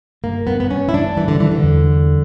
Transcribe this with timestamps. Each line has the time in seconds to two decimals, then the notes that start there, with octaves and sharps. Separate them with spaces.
0.24 G2 A#3
0.46 G2 B3
0.60 B3
0.71 G2 C#4
0.89 E4
0.93 G2 D4
1.16 E3 G3
1.28 D3
1.39 E3 G3
1.52 D3
1.63 E2
1.86 G3